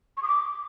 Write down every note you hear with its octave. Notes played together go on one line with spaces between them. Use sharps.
C#6
D#6
D6